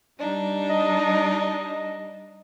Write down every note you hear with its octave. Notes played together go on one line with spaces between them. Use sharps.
G3 D4 D#4
D#5